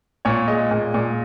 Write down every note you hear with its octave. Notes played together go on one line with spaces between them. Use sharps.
A#2 C#5
G#3 D#5
A#2
A#2